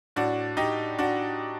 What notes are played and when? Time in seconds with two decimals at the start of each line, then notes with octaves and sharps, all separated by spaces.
0.16 A2 D4 F#4
0.57 D#4 G4
0.99 D4 F#4